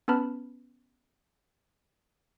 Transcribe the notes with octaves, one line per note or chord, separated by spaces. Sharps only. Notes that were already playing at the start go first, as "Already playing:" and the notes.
B3 C#4 B4 A5 B5 F6